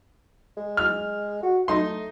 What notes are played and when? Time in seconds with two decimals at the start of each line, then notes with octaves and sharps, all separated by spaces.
0.57 G#3
0.77 F6
1.43 F#4
1.68 A3 D#4 C6